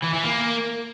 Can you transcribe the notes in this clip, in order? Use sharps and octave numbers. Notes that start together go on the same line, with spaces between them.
E3
E3
A#3